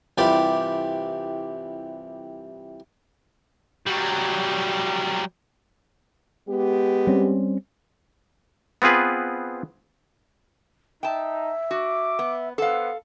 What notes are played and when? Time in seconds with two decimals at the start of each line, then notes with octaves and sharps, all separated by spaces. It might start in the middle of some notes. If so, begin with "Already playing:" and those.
0.18 C2 E3 F4 G4 D5 B5
3.86 F#3 G3
6.49 G#3 B3 G4
7.07 G3 C4 C#4
8.82 B3 C4 F4 G#4 B4
11.03 D#4 E5 G5 A5
11.71 F#4 D6
12.19 B3
12.58 B3 A4 C5 F5 F#5